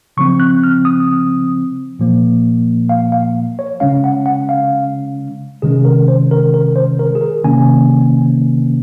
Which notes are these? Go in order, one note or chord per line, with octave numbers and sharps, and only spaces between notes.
C#3 F3 C4 C#6
F#6
F6
D#6
A#2 F3 A#3
F5
F5
C#5
C#3 G#3 C#4 F5
F#5
F#5
F5
C3 D#3 G#3 C#4 G#4
A#4
C5
A#4
A#4
C5
A#4
G#4
A#4
C3 D#3 A#3 C#4 G#5